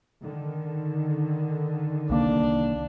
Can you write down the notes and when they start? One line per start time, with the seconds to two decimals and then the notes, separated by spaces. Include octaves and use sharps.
0.23 D3 D#3
2.10 C2 A#3 D4